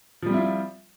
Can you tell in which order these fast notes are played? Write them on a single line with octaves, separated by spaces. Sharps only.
F3 G3 C4 E4 F4